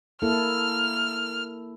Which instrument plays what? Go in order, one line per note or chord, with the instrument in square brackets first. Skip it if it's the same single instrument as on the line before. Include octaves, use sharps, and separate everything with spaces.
[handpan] A#3 E4 A4 [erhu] F6